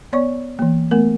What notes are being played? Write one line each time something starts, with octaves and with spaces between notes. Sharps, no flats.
B3 C#5 D5 C#6
E3 A#3
A3 B3 A#4